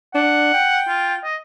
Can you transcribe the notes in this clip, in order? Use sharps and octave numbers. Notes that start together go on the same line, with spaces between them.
D4 F#5
G5
F4
D#5